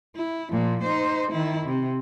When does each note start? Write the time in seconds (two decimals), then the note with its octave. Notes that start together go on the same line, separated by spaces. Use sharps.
0.16 E4
0.51 A#2 F3
0.83 D#4 C5
1.31 D#3 E4
1.66 C3